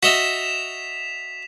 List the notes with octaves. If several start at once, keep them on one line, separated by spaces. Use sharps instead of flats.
F#4 D#5 E5 B6 E7 F7